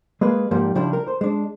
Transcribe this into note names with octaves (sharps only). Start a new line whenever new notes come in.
G#3 A#3 G#4 B4
G#2 F3 G3 A#3
C#3 F3 G3 D4 E4 G4
A#4
C5
G#3 D4